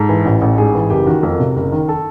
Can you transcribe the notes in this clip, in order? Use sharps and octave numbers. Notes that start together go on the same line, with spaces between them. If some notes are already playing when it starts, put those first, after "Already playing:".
Already playing: G#2 A4
E3
A1
A1
G#2 G#4
E3
F#1 G4
D#3 F#4
F2 A#4
C3
F#1
D#3
A4